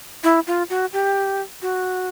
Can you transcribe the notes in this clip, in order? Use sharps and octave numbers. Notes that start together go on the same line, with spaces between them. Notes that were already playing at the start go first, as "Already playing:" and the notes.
E4
F4
F#4
G4
F#4